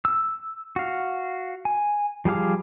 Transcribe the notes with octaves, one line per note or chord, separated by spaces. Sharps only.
E6
F#4 F5
G#5
F3 G3 G#4 F5 D6